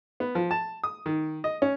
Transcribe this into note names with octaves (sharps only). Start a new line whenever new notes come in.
B3
F3
A5
D#6
D#3
D#5
C#4